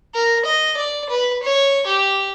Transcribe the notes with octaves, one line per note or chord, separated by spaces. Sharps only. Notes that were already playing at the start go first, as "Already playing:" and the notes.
A#4
D#5
D5
B4
C#5
G4